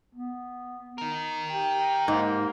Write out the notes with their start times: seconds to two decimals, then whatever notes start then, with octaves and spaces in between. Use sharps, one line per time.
0.15 B3
0.98 A#4 D#5
1.50 G4 G5
2.08 G#2 A#3